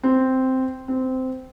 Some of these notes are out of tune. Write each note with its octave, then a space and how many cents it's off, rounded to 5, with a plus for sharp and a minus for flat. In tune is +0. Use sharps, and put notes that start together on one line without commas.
C4 -5
C4 -15